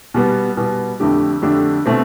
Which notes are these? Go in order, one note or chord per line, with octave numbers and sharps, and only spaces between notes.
B2 G3 B3
B2 G3 B3
F2 D3 A3 D4 G4
F2 D3 A3 D4 G4
B2 A3 C4